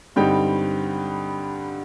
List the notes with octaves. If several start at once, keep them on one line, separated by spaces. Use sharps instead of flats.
G2 D3 G3 C4 D#4 G5